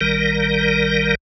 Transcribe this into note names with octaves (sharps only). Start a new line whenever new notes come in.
A#1 D#3 G3 A#4